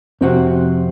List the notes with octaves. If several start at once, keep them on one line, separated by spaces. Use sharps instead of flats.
F2 C3 C4 F#4